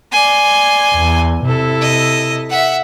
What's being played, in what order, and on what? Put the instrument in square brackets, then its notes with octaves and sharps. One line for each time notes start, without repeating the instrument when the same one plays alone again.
[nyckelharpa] D5 C6 [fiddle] G#5
[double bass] E2
[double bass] C3 [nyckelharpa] E4 A4
[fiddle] D#5
E5 F#5